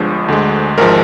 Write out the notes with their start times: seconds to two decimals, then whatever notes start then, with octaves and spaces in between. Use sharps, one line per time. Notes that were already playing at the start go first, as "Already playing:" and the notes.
Already playing: G1 G2 F3 G#3 C5
0.28 D2 D3 G#3
0.78 G#1 F3 G#3 A#4